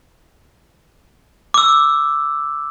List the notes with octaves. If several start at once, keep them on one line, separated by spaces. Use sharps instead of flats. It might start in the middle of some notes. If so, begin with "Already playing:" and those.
D6 E6